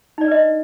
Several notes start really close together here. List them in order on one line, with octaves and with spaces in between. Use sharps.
D#4 D5 D4 B4 D#5